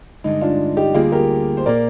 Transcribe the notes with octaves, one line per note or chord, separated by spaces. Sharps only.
G2 D3 G#3 D#4
D4 F4
D#4 G4
D2 D3 G3 A#3 F4 G#4
G4 A#4
C5
A#2 F3 A#3 A#4 D5